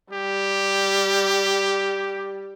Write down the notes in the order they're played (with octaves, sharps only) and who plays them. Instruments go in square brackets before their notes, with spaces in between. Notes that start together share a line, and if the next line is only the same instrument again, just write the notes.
[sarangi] G3 [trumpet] G4